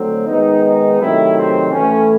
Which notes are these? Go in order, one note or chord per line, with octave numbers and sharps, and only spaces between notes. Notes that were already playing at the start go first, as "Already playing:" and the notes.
Already playing: D3 F#3 A3 C4
D#3 G#3 B3 D#4
D#4
C3 D#3 F#3 A3 E4
C4
A2 E3 A3 C#4